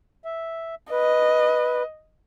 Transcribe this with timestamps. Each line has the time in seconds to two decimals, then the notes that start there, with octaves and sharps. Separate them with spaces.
0.25 E5
0.91 B4 D#5